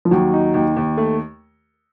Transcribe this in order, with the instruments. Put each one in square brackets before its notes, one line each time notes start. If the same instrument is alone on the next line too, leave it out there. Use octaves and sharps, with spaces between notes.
[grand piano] F3
[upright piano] D#2 [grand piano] F#3
[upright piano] D#4
D#2
D#2
A3